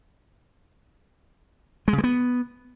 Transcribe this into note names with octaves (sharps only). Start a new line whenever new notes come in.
G#3
C#3
G#3
B3